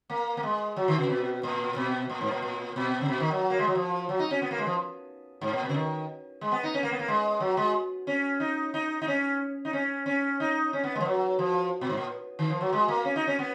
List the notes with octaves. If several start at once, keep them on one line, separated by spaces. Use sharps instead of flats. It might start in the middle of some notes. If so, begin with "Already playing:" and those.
A#3
A#3
G#3
F#3
D#3
C#3
B2
A#2
B2
A#2
G#2
A#2
A#2
B2
C#3
B2
D#3
F#3
A#3
G#3
F#3
F3
F#3
D#4
C#4
B3
A#3
G#3
F3
G#2
A#2
B2
C#3
D#3
G#3
B3
D#4
C#4
A#3
B3
A#3
G#3
F#3
G#3
C#4
D#4
D#4
D#4
C#4
D#4
C#4
C#4
D#4
C#4
B3
G#3
F3
F#3
F3
B2
G#2
A#2
D#3
F3
F#3
G#3
A#3
C#4
D#4
C#4
B3